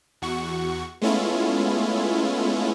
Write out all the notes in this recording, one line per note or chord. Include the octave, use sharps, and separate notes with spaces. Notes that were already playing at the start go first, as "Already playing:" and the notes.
E2 F#4 C#6
G#3 A3 B3 C#4 E4 F4